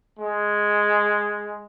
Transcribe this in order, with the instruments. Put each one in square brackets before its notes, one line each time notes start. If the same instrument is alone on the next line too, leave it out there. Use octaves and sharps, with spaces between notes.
[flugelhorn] G#3